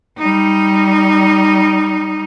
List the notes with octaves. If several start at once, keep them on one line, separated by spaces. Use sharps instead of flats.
G3 D#4